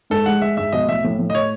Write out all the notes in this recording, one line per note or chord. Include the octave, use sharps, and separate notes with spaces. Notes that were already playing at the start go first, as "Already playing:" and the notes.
G#2 A4
G#3 F#5
G#3 E5
G#2 E5
B1 D#5
A2 E5
A2
A2
D#5
C#5